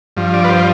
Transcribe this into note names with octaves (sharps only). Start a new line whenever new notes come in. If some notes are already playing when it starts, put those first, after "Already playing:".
G2 F3
D5
B4
C5